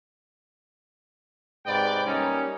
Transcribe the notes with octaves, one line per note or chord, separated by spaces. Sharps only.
G#2 C3 B4 D5 G5
G3 A#3 C#4 D#4